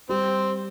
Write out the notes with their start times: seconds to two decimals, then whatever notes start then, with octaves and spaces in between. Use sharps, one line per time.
0.09 G3 C4 G4